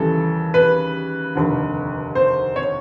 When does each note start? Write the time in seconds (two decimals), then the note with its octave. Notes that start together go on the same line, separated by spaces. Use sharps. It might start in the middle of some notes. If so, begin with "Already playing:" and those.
Already playing: D#2 C#3 E3 G3 A4
0.54 B4
1.35 F1 D#2 D3
2.15 C5
2.56 C#5